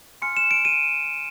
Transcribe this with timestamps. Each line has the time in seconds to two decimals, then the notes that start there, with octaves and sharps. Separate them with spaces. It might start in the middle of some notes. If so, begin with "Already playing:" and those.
0.22 G#5 C6 F6 C#7
0.37 E7
0.51 D7
0.65 D#7